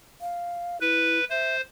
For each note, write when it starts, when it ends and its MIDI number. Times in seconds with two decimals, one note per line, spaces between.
0.21 0.80 77
0.81 1.19 64
0.81 1.24 71
1.30 1.61 72
1.30 1.56 76